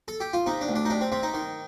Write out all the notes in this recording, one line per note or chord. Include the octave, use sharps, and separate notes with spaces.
A4
G4
F4
C3 D#4
D4
D2
D4
D#4
C3 D4
C4
C3 C4
D#4
D#3